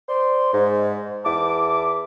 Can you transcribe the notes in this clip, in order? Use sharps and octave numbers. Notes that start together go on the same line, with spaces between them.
C5 D5 C6
G#2
E2 E4 A5 D6